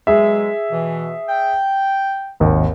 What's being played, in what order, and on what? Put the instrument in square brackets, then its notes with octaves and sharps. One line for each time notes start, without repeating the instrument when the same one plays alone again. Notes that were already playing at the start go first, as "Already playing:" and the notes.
[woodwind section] B2 F#3 G#3 [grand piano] G#4 E5
[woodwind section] B2 E3
G5
[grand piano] G#1 D#2